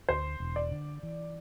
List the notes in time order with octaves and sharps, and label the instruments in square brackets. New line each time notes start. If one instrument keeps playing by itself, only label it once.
[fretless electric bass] D2 [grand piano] C5
[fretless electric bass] E1
[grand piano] D5
[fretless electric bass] D3
E3